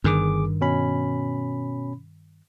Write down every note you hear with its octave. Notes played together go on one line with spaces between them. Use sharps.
G1 G2 D#3 G#4 D6
B2 C#4 B5